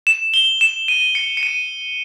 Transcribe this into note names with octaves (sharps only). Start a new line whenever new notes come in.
E7
G7
E7
D#7
C#7
C#7
D#7